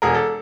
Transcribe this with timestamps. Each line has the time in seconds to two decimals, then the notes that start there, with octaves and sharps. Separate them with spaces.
0.02 E1 G#4 A#4
0.14 A4